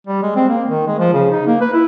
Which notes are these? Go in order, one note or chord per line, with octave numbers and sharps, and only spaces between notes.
G3
G#3
C4
A#3
D#3
G#3
F3
C#3
D#4
A#3
B4
E4